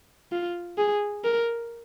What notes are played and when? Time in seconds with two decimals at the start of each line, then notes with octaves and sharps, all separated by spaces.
0.32 F4
0.78 G#4
1.24 A#4